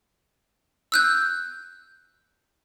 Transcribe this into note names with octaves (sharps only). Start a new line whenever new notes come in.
E6 F#6 G6